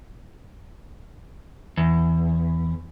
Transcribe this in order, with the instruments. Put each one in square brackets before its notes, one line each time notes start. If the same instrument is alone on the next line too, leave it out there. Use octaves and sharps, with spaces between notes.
[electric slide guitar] E2